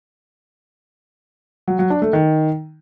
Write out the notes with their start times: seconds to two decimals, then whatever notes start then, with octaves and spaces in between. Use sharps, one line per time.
1.68 F#3
1.79 F#3
1.90 D4
2.02 A3
2.13 D#3